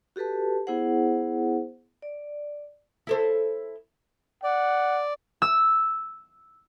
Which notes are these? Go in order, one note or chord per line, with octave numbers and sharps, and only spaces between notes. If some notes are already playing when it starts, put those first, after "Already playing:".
F#4 G4 A4 B4 A5
B3 E4 G#4 C5 F#5
D5
E4 A4 C5
D5 F#5
E6